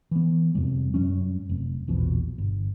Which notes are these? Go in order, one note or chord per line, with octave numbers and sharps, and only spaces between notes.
E3 B3
F2 C3 G3
F#2 F#3 G3 C#4
F1
A#1 E2 B2 F3
G1